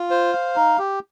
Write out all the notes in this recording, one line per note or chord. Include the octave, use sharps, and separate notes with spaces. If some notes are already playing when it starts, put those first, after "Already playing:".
Already playing: F4
C5
F5
D#4
G4